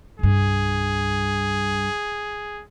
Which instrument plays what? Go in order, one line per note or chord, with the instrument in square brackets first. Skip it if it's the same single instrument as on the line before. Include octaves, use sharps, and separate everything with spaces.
[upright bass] C2 G2 [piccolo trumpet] G#4